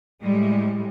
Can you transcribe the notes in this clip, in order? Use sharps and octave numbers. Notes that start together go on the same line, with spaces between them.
A2 G3 G#3